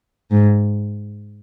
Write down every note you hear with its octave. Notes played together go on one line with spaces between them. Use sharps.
G#2